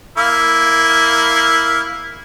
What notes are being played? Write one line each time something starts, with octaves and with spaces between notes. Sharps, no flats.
A#3 E4 F5